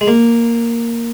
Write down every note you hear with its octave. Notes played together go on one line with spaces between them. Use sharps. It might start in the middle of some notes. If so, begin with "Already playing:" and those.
G#3
A#3